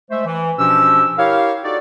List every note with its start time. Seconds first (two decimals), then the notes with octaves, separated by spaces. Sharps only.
0.11 G#3 A3 C5 E5
0.26 E3
0.59 B2 F3 C#4 D4 G4 E6
1.18 E4 G4 A#4 C#5 F5
1.64 D#4 F#4 G4 A4 D5